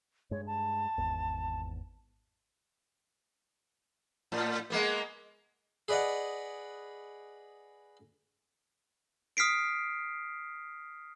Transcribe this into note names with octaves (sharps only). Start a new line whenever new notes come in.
G2 G#3 C#5
A5
G#1 E2
A2
G#3 A#3 B3
G#4 B4 D5 D#5 F#5
D#6 F6 B6 C7 D7